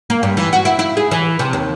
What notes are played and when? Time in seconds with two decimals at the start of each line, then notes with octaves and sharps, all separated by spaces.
0.10 A#3
0.23 G2
0.37 E3
0.53 F#4
0.65 E4
0.79 E4
0.97 G#4
1.11 E3
1.39 C3
1.53 D#2